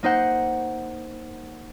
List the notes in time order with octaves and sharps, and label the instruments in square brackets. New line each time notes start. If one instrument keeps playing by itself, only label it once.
[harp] A#3 D#4 C5 F#5